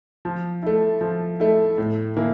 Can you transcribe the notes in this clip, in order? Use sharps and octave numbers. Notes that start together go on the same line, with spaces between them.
F3
A3 E4
F3
A3 E4
A2
E3 A#3 E4